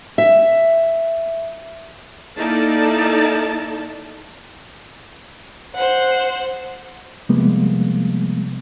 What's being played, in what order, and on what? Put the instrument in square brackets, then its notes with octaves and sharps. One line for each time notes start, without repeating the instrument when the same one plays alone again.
[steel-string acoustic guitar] E5
[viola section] A#3 D#4 E4 A4 D5 A5
[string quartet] C5 F#5
[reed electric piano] C3 F3 G3 G#3 A#3 B3